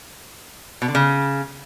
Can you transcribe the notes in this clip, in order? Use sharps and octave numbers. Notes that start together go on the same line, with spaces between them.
B2
D3
C#3